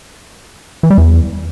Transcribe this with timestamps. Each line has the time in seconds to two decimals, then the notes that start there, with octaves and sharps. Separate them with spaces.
0.83 E3
0.90 G3
0.98 E2